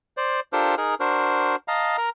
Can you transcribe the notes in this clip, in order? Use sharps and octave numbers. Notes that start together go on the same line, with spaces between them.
C5 D5
D4 F4 G4 A4 A#4 C5
D#4 G#4 A#4
D4 F#4 A#4 C5
D#5 F5 A5 A#5
A#4 A#5